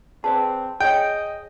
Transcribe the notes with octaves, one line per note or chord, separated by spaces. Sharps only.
C4 G#4 B4 D5 A5
G#4 C#5 D#5 G5